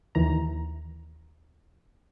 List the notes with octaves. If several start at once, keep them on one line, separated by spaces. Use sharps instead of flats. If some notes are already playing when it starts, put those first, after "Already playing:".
D#2 E3 A#5